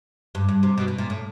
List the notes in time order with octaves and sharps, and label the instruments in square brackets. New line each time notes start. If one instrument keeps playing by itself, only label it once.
[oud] G2
G2
C3
B2
B2
A#2
A2